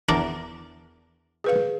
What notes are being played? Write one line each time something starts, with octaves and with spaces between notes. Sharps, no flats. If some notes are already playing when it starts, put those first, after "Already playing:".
E2 D4 A#4
G#4 B4 F5